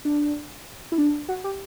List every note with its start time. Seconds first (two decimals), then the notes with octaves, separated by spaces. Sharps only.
0.05 D4
0.92 E4
0.98 D4
1.29 F#4
1.44 G4